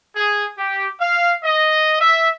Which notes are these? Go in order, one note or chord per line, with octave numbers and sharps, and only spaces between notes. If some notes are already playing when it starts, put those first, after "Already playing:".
G#4
G4
F5
D#5
E5